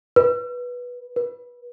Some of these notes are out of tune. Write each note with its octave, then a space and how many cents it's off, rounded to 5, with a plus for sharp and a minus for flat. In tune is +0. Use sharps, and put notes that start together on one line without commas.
B4 -10
B4 -20